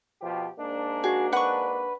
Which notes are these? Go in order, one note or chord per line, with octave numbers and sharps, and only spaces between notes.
B2 F3 G4
G#2 A#3 D4
F#4 G#4
B4 F#5 C#6